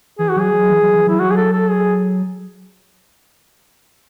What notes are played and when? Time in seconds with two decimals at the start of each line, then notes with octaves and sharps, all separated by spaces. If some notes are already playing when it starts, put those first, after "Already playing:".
0.19 E3 G#4
0.30 F#4
0.36 F#3 G#4
0.53 F#3
0.70 E3
0.82 F#3
0.94 E3
1.07 F#3 E4
1.20 F#3 F#4
1.31 G#4
1.36 A4
1.53 A4
1.70 G#4